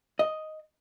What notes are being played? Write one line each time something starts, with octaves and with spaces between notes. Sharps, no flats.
D#5